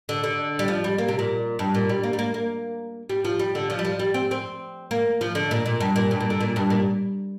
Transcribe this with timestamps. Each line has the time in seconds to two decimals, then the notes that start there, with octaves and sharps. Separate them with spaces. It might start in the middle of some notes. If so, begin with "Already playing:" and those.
0.09 D3
0.24 D3
0.59 G3
0.68 F3
0.84 G3
0.98 A#3
1.08 C3
1.19 A#2
1.59 G2
1.75 A#2
1.89 G3
2.03 A#3
2.13 G3
2.19 A#3
2.34 A#3
3.09 G3
3.25 F3
3.40 G3
3.55 D3
3.70 F3
3.79 G3
3.85 F3
3.99 G3
4.14 C4
4.31 C4
4.91 A#3
5.21 F3
5.35 D3
5.51 A#2
5.66 A#2
5.80 G2
5.96 A#2
6.11 G2
6.20 A#2
6.30 D3
6.41 A#2
6.56 G2
6.70 A#2